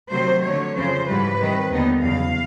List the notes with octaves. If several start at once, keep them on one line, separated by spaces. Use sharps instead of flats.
C3 D#3 F#3 A3 C5
D3 F#3 A3 C#5
F2 C#3 F3 C5
G#2 E3 G3 B4
C3 D#3 G3
D#2 D3 G3 B3 D#4
E2 C#3 F#3 F5